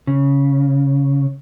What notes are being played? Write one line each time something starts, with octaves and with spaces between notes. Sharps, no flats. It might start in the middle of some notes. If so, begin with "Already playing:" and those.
C#3